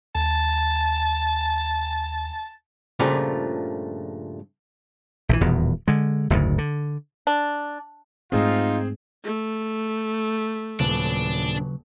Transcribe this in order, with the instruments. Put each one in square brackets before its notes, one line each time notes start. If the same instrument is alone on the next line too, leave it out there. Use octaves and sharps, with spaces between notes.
[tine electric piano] D#2 [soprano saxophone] A5
[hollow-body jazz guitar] G2 A#2 C#3 F3 A3
[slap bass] A#1 D#3 E3
D#1 E2 B2
D3 G#3
F#1 D2 G#2
D3
[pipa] D4
[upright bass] G#2 A3 [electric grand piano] C4 G#4 C5 [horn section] D#4 F4
[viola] A3
[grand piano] D#1 [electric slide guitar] C#3 F#3 B4 [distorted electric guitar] D4